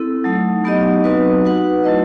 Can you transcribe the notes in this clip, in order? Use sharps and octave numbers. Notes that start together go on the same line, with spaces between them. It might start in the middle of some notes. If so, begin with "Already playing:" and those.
Already playing: C4 E4 A4
F#3 A3 D#4
F#3 B3 D#4 G4 D#5
F#3 C4 D#4 F#4 B4
D#4 F#4 B4 F#5
F#3 A3 E4 B4 D#5